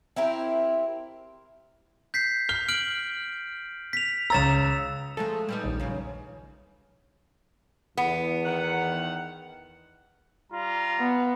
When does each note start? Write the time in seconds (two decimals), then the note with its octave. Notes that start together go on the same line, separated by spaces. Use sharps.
0.16 C4 E4 G4 A#4
2.14 G6 B6 C7
2.49 F6 G7
2.69 F6 D7 F#7
3.93 B6 F7
4.30 C#2 C#5 A#5 E6 A6 E7
5.17 F3 G#3 A3 A4
5.49 G3 B3 D#4
5.63 A#1 D#2
5.80 F#2 C#3
7.97 E2 B3
8.45 D#3 F#5
10.52 G3 F4 A#5
10.99 B3